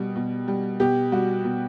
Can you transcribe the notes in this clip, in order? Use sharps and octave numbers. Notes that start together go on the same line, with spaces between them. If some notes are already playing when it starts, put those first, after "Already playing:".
Already playing: B2 G3
B2
G3
B2 G4
G3 F#4
B2